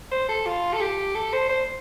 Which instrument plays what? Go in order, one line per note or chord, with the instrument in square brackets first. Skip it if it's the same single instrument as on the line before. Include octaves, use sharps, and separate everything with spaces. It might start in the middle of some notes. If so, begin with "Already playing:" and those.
[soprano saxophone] C5
A4
F4
A4
G4
A4
C5
C5